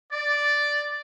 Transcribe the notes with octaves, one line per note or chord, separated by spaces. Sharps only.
D5